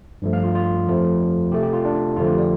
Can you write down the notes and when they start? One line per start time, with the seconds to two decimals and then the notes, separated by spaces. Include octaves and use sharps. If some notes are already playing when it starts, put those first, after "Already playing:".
0.22 G2 F3 A3
0.33 F5
0.44 F4
0.55 F4
0.87 F2 F3 A3
1.52 C3 A3 G4
1.63 G4
1.73 F4
1.85 D4
2.16 F2 D3 F3 A3 F4
2.28 G4
2.38 D5